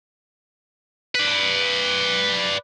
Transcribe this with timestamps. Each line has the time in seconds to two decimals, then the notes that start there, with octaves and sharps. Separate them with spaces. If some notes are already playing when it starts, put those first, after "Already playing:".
1.15 B4 D5